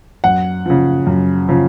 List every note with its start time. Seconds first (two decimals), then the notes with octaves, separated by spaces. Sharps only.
0.24 F#2 F#5
0.66 C#3 F3
1.07 F#2
1.49 C#3 F3